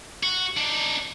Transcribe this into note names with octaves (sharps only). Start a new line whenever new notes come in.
F#4
D4 D#4